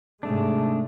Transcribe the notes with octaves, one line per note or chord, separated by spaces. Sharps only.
G#2 C3 G#3 A3 D4